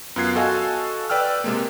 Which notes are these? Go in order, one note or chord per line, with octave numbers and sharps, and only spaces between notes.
F#2 B3 F4 F#6 G#6 C7
F#4 A4 D#5 F5 G#5
B4 D5 G5 E6 F6
C3 G#3 A#3